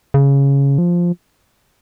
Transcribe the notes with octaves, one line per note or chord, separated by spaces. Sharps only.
C#3
F3